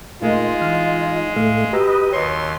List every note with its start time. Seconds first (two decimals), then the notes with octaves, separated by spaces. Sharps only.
0.22 A#2 G#3 A3 D#4 F4 A#4
0.61 E3 F6
1.36 A2 A3 F5
1.73 F#4 G4 B4 D#5 A#5 E6
2.12 D#2 C#5 C6